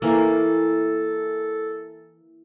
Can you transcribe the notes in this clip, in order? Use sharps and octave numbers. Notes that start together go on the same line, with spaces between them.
E3 A#3 A4